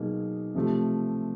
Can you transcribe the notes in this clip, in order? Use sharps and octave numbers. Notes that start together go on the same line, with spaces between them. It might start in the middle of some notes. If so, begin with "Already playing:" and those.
Already playing: B2 F#3 A#3 D#4 G#4
C3 F3 A3